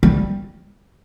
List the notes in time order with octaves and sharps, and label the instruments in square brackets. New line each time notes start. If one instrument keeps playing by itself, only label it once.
[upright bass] G3